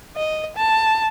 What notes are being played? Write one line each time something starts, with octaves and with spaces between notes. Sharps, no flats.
D#5
A5